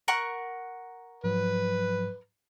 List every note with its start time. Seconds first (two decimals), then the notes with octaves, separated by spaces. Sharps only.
0.08 A#4 F#5 C#6
1.24 G#2 F3 F#3 B4